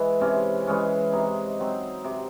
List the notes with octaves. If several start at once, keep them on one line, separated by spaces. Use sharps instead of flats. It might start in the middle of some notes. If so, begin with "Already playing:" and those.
Already playing: E3 G#3
C3 C#4
E3 G#3 C#4
C3 D#4
F#3 C4
C3